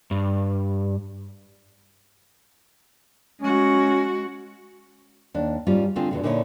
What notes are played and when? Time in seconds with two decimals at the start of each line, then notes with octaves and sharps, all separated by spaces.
0.11 G2
3.41 G#3 C#4 F#4
5.34 D#2 D4
5.67 G#2 G3 C#4 F4
5.96 D3 A3 C4 F4 G#4
6.11 E2 B2 D3
6.23 A#2 D3 D#4 E4 A4 C#5